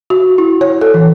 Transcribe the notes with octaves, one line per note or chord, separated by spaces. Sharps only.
F#4
E4
C#5
A4
E3